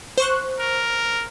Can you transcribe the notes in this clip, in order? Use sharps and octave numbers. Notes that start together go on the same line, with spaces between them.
C5 C#6 F#6
A#4